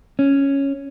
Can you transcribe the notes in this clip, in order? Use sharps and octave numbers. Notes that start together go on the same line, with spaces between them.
C#4